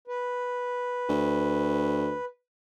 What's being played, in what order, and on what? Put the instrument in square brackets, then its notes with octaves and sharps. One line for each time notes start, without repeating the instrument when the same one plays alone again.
[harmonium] B4
[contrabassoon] D2